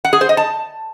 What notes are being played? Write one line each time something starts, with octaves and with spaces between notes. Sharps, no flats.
F#5
G#4
C5
D#5
A5